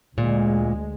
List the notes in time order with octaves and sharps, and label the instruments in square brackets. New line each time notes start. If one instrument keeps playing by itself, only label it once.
[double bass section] D2 G#3 [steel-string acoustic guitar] A#2